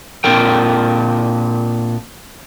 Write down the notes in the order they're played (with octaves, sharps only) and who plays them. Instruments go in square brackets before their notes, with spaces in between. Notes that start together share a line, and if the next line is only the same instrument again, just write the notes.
[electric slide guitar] A#2 C4 D4 A#4 G5